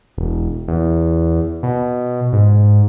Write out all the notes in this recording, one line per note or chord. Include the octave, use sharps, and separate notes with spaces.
E1
E2
B2
G#2